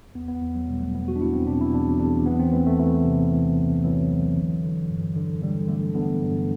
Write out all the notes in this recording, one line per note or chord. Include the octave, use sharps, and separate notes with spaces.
E2 B3
B3
E2
F#3
B2 G3
A3
E2 B3
F#4
D4
E2 E4
C4
B2 D4
E4
E2 D4
E2 D4
E3 B3
C4
E3 A3
A3
E3 A3
C3
E3
C2
E3 F#3
E3
D3
D3
G2
D3
D3 G3
D3 A3
D3 B3
G2